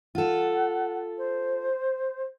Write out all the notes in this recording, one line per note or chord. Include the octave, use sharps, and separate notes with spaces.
F4 A4 F#5
C5